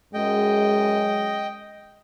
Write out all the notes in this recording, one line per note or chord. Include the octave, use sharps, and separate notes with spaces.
F#2 F#3 G#3 D#5 G5